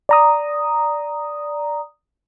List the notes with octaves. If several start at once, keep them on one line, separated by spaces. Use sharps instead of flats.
D5 A#5 D#6